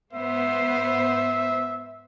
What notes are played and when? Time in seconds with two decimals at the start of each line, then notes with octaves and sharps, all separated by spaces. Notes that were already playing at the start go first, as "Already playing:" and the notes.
0.13 G#2 B3 C5 E5